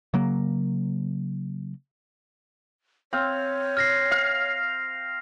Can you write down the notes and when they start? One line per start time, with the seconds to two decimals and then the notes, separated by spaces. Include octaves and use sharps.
0.14 C#3 F#3 A#3
3.13 C4 C#5 F5
3.77 F6 A#6 C7
4.11 F5